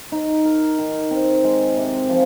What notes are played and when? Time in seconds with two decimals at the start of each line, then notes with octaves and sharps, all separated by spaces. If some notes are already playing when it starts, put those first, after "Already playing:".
0.12 D#4
0.45 A#4
0.78 D#3
1.11 C4
1.44 G#3
1.77 C3
2.09 F3